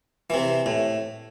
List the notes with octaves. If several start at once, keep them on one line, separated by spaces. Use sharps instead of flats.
C3 E3
A2